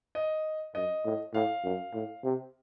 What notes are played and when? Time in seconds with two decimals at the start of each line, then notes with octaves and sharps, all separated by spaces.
0.15 D#5
0.75 F#2 D#5
1.05 A2
1.34 A2 F5
1.64 F#2
1.94 A2
2.24 C3